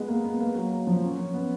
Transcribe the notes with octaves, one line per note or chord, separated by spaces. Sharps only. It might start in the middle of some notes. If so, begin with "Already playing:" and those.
Already playing: G#3 B3
A#3
B3
A#3
F#3
F3
C#4
C#4
B3